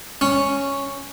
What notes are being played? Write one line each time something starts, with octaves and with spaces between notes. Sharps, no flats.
C#4